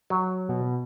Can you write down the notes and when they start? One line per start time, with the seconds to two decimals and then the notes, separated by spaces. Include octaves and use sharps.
0.10 F#3
0.49 B2